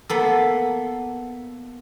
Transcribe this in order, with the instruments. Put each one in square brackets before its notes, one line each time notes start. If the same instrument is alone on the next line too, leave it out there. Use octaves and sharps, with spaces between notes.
[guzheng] A#3 B3 A4